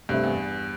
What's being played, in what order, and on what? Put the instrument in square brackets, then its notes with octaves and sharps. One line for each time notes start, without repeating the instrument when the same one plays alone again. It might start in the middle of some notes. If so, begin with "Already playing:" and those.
[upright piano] G2 [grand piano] C3 A3 C4 G4 E5
[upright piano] E2